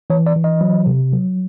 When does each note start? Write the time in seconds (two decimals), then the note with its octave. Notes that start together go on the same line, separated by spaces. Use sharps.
0.10 E3 C#5
0.26 D5
0.36 E3
0.44 D#5
0.61 F#3
0.87 C3
1.13 F#3